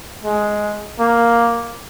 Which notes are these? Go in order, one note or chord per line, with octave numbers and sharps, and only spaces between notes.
G#3
A#3